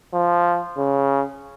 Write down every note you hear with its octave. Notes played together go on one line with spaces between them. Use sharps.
F3
C#3